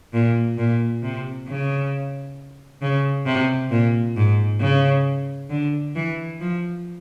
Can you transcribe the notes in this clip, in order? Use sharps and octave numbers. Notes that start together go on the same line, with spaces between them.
A#2
A#2
C3
C#3
C#3
C3
A#2
G#2
C#3
D3
E3
F3